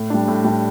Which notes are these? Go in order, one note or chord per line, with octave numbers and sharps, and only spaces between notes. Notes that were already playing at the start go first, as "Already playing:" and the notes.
Already playing: A2
G3 D4
A2
G3 D4